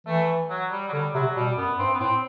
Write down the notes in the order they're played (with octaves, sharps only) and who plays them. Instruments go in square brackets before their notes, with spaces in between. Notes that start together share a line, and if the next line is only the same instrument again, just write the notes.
[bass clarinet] E3 [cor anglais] A3
[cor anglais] F#3
G3
F#3
[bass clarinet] D3 [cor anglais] G3
[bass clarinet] C3 [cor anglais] F#3
[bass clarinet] B2 [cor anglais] G3
[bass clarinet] F#2 [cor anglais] B3
[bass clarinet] G2 [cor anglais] C4
[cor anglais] B3
[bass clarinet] A2 [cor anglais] C4